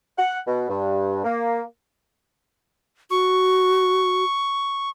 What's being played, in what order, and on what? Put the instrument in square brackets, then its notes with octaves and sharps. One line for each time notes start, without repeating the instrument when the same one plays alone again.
[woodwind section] F#5
B2
G2
A#3
[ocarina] F#4 [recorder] C#6